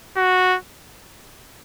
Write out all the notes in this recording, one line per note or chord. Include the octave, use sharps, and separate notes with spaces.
F#4